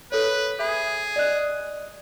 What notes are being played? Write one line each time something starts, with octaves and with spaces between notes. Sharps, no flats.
A4 B4 C#5
G#4 E5 B5
D5 D#5 F#6